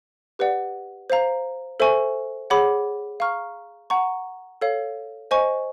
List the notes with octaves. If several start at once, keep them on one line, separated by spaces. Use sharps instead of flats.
G4 B4 D5 F#5
C5 F5 A#5
A4 C5 E5 G#5 C#6
G#4 C#5 F#5 B5 D6
F5 A#5 C#6 F6
F#5 A#5 C#6
A4 C#5 F5
C5 D#5 G#5 C#6